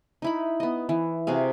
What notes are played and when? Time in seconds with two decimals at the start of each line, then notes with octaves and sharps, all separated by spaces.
0.22 D#4 E4 B5
0.60 B3 D#5
0.89 E3
1.27 C3 F#4 G#4 F5